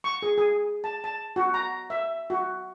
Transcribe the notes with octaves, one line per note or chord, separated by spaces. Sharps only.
C#6
G#4
G#4
A5
A5
F#4
A#5
E5
F#4